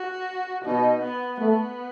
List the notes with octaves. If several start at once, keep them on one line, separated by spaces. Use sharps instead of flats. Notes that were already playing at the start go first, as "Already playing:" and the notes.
Already playing: F#4
B2 D#4
B3
A3 B3